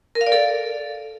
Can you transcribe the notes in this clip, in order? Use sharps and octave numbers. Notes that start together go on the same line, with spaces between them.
A#4
F5
D5
A4